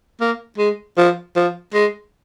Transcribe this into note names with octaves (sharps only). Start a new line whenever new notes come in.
A#3
G#3
F3
F3
G#3